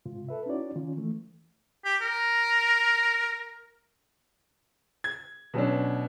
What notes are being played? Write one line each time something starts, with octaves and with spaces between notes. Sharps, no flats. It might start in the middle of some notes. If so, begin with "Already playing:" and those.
G#2 C3 F4
A4 B4 E5
C#4 D#4 E4 F#4 C#5 D5
D#3 C#4 F4
E3 A3
G4
A#4
G#6
B2 F#3 C#4 D4